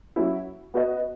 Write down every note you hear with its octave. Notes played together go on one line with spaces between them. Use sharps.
F#3 C#4 E4
B3 F#4 B4 D#5